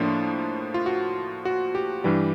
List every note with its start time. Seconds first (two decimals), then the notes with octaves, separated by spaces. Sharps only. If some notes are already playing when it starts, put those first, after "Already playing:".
Already playing: A2 F3 A#3 D4 F4
0.74 F4
0.86 F#4
1.45 F#4
1.75 G4
2.04 G2 E3 G3